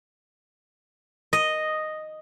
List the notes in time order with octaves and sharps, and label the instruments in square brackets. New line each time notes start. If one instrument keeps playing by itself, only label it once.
[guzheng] D#5